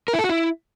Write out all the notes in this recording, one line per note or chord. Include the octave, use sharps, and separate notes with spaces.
A#4
E4
A4
F#4
E4